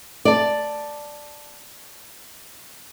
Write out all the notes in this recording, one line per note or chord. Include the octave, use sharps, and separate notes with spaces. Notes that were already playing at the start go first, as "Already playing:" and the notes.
D5 A5